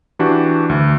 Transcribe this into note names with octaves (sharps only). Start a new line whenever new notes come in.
E3 D4 F#4 G4
D2